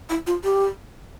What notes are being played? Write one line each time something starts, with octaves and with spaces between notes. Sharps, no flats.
E4
F4
G4